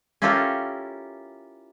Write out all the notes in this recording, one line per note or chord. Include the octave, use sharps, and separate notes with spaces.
C#4 E4 F4 G4 A4 A#4